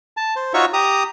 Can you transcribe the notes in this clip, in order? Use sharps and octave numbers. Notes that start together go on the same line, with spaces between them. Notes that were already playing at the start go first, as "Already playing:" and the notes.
A5
C5
D#4 F4 F#4 C#5 E5 C#6
G4 A#5 D#6